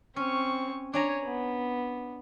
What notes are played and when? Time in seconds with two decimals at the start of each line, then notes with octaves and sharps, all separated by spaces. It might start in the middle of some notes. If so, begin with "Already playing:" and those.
0.16 C4 C#4 C#6
0.94 D4 C#5 G#5 A#5
1.24 B3